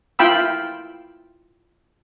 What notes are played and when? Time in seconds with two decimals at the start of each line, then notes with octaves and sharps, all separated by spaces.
0.19 E4 F4 G5 B5 E6